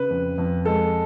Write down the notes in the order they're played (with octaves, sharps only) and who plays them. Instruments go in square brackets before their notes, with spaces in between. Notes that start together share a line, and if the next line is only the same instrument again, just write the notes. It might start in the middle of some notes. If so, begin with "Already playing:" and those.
Already playing: [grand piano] C#3 B4
F2
F2
G#3 A4